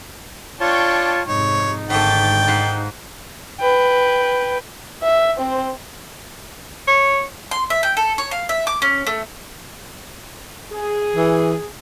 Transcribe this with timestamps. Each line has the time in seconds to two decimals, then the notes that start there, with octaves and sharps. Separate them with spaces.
0.60 D4 F4 C#5 G5 A5 C#6
1.28 F2 G#2 C3 D#4 C#5
1.90 G#1 G#2 D3 A3 G5 A6
2.48 G#2 F5 F#5
3.60 B4 G5
5.03 E5
5.38 C4 C5
6.88 C#5
7.51 C6
7.70 E5
7.83 G5
7.97 A4
8.18 C#5
8.31 F5
8.49 E5
8.67 D6
8.82 C#4
9.07 A3
10.71 G#4
11.16 E3